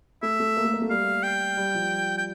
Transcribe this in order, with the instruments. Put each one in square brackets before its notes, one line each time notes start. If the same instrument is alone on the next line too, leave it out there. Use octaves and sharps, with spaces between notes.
[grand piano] A3 [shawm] E5
[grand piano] A3
A#3
A3
A#3
A3
[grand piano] G3 [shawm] F5
[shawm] G5
[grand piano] G3
F3
[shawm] G5